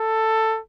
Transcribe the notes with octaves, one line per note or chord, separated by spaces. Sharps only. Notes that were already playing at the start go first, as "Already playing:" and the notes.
Already playing: A4